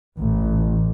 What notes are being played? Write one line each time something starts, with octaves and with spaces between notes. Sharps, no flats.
A1